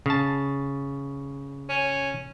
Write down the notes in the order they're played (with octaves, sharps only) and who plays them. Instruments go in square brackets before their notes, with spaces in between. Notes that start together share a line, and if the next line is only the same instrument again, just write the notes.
[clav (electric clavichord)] C#3 A5
[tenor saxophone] C#4